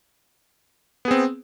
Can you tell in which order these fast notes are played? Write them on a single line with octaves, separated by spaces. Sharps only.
B3 G#4 C4